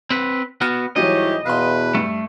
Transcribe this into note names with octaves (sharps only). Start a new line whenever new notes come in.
C4 B4
B3 F#4 F6
G#2 E3 F#3 G3 E4 G4 C#5 D#5
E2 B2 B4 F5 C6
G2 A3